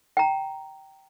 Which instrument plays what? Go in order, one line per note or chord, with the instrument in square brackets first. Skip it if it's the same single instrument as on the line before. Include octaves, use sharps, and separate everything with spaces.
[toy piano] G5 A#5